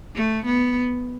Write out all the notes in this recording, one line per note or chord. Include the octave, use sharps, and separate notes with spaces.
A3
B3